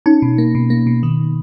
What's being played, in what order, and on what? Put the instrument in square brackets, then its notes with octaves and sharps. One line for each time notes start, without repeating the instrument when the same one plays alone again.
[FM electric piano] C#4 [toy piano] D#4
[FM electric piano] B2
A#3
B2
A#3
B2
D#3